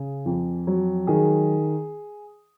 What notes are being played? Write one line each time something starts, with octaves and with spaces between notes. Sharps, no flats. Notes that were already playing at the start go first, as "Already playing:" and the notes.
Already playing: C#3 G#4
F2
F#3
D#3 G#4